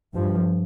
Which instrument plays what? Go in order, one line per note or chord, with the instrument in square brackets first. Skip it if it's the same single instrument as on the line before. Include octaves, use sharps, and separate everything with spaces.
[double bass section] G2 F3